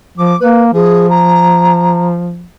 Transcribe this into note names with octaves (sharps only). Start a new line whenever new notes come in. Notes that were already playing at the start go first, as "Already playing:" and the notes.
F3 D6
A#3 B4
F3 G#4
A#5